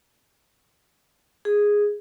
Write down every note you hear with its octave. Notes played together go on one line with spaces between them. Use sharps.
G#4